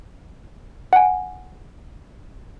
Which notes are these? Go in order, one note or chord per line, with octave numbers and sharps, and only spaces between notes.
F#5 G#5